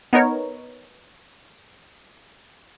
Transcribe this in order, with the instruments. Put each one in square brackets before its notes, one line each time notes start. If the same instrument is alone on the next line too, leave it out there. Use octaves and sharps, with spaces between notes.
[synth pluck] B3 D#4 A#4 C#5